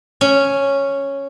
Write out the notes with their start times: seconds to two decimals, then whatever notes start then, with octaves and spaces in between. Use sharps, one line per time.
0.21 C#4